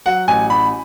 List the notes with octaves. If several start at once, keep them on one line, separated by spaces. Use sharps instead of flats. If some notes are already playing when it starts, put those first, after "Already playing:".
F#3 F#5
A1 G#5
A1 B5